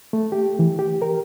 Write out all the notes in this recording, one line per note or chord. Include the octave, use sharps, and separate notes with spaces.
A3
G4
E3
G4
A#4